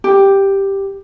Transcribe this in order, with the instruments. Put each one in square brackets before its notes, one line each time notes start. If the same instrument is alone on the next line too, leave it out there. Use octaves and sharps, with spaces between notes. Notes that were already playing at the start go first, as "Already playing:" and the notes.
[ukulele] G4